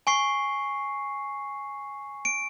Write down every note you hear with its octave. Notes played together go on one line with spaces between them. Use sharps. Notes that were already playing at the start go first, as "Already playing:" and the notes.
G#5 C#6 C7
D7